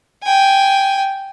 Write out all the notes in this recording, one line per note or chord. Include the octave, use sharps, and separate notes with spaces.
G5 G#5